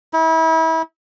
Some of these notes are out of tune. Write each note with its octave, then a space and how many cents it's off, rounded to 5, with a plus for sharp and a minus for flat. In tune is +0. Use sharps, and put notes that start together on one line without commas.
E4 -35